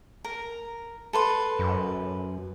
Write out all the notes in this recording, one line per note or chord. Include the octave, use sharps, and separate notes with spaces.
A#4
A4 B4 C6
F#2